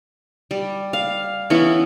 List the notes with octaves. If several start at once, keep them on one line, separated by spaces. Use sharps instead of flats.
G3
F5
E3 B3 C#4 E4